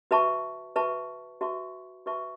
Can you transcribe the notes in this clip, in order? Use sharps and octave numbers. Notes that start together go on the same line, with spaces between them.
F#4 B4 E5 A5 C#6
F#4 B4 E5 A5 C#6
F#4 B4 E5 A5 C#6
F#4 B4 E5 A5 C#6